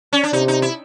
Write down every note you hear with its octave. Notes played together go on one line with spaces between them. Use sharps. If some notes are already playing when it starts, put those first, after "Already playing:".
C#4
D4
C3 D#4
D#4
E4